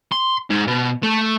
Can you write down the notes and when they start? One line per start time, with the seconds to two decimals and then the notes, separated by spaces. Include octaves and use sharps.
0.12 C6
0.50 G#2
0.67 B2
1.03 A3